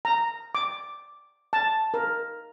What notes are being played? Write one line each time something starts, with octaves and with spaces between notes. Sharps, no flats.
A#5
D6
A5
A#4